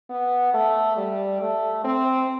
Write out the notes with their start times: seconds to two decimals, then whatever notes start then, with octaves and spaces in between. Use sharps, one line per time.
0.10 B3
0.54 A3
0.97 G3
1.41 A3
1.84 C4